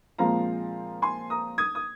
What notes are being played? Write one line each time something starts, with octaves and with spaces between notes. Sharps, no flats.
A#2 F3 G#3 C4 F5 A#5
G#5 C6
A#5 D#6
D#6 G#6
D#6